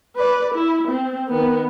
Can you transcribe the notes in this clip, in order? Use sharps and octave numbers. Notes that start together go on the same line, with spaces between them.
B4 D5
E4
C4
D#3 B3